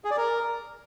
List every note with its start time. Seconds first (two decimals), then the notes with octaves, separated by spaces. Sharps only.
0.05 G#4
0.11 D5
0.17 A#4